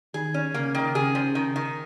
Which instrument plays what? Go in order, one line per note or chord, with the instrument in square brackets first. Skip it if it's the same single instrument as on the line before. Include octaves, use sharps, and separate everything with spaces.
[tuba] D#3 [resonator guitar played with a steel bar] G#4
[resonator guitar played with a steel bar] C#4
[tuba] C#3 [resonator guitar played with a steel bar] A#3
[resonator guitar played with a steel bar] D#3
[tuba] C#3 [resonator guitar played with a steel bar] G#4
[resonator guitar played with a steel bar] F3
D#3
D#3